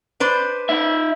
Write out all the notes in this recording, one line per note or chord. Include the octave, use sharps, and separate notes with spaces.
D4 B4 C5
D#4 E5